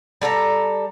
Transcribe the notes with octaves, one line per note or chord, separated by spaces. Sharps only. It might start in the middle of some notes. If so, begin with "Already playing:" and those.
G3 A4 C5 A#5